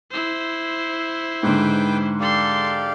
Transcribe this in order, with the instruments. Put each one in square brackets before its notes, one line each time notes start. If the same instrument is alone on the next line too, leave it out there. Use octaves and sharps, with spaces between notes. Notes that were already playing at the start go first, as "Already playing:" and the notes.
[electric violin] E4 C5
[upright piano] G#2 D3 [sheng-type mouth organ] B4 G5 D6
[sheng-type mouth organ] G4 D5 F5 [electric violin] A4 C6